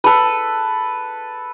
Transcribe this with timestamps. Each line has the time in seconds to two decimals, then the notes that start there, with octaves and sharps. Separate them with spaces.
0.04 A4 B4